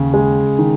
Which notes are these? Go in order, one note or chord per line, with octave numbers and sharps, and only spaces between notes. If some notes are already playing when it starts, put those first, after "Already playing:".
Already playing: D#2 C#3
G#3
D#3